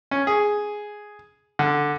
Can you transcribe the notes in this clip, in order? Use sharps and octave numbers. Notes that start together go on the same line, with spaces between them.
C#4
G#4
D3